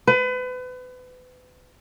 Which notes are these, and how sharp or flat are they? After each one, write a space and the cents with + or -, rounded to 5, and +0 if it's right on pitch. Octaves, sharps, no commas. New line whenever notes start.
B4 +35